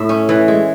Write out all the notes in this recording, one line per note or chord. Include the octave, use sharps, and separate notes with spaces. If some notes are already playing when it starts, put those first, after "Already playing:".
Already playing: A2 E5
C#4
E3
G#3